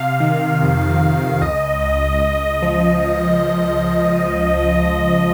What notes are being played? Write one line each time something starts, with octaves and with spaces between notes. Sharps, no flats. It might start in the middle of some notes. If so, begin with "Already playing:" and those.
Already playing: C3 F5
D#3
F2
F2
C#2 D#5
C#2
C#2
F3